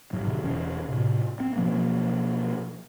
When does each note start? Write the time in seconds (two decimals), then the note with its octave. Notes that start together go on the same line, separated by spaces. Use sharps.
0.13 G#2 F#3
0.27 B2 D3
0.43 E1 E2 C#4
0.89 A2 C3
1.40 C4
1.56 B2 F3 F#3 A#3